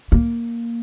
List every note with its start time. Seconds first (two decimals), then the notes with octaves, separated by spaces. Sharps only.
0.12 A#3